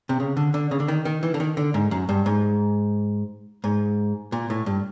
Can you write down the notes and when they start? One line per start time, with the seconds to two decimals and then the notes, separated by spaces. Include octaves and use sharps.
0.09 C3
0.20 C#3
0.37 D3
0.54 D3
0.71 C#3
0.80 D3
0.88 D#3
1.05 D#3
1.23 E3
1.34 D3
1.40 D#3
1.57 D3
1.74 G#2
1.91 F#2
2.09 G2
2.26 G#2
3.64 G#2
4.32 A#2
4.50 A2
4.66 G2